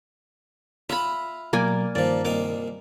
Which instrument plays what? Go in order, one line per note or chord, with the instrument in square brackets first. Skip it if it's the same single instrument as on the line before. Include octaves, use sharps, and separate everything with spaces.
[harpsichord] F4 F#5 [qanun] E5 B5
[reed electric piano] B2 F#3 [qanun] A#3 D5 G#5
[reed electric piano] G2 D#3 [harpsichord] A#2 F3 [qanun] D5
[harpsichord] C2 A#2 D#4 [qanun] D6